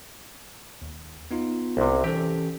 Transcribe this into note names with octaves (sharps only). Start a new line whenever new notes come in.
D#2
B3 D#4 F4
C2 C3
E3 C#4 G4 A4